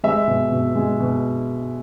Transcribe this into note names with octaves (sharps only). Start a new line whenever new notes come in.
G#3 E5
B2
B2
G#3
B2